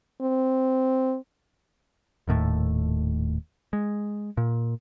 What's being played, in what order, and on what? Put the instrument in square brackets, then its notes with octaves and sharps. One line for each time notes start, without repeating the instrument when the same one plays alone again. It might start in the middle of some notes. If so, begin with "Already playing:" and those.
[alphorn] C4
[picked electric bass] D#1 D#2 A2 A3
G#3
A#2